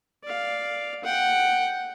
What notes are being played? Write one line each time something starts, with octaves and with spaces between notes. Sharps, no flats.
D5 F5
F#5 G5